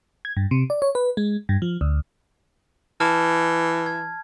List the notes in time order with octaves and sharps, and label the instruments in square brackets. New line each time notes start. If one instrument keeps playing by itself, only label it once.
[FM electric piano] G#6
G2
C3
D5
C#5
B4
G#3
G2
F3
D2
[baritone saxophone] E3 [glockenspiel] A5 F6
[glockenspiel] G#6